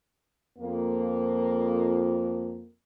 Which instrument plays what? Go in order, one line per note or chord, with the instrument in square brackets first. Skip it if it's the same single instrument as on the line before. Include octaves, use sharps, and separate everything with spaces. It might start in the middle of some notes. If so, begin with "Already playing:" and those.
[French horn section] F2 A#3